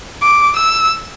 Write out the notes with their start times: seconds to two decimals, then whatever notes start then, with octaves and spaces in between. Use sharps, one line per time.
0.22 D6
0.56 E6